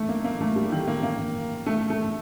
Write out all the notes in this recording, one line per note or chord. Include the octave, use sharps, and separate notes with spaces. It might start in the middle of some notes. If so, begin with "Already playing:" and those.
Already playing: A3
A#3
A#3
A3
G3
D#3
A#3
A#3
A3
A3